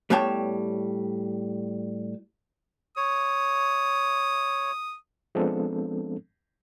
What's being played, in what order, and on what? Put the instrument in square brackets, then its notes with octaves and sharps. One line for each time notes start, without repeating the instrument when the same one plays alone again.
[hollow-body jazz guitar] A2 G3 B3 C#5 G5 A5
[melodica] C#5 [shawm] D#6
[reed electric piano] F3 G#3 B3 C4 D4 A4